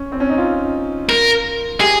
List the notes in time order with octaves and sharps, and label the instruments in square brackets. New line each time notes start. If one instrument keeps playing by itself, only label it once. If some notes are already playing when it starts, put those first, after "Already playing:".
Already playing: [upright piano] C#4
C4
C#4
D#4
F4
[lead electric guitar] A#4
[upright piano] G4 [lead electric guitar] G#4